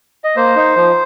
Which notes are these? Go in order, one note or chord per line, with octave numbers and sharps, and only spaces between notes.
D#5
A#3 C5
D#4
F3